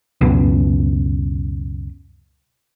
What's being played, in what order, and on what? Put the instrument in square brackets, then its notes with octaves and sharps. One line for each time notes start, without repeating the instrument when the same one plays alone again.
[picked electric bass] C#2 F#2 B2